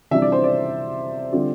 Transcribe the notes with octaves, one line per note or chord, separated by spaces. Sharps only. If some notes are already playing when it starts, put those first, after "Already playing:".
C3 E3 G3 D4 F4 E5
D5
C5
D5
D3 G3 C4 F4